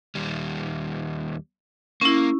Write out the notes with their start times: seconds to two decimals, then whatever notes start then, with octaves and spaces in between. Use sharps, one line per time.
0.15 D#2 G3
2.01 A#3 C#4 E4